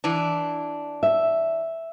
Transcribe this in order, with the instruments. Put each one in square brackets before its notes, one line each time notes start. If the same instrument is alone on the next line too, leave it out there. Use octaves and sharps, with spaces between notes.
[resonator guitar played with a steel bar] E3 D4
[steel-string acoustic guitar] E5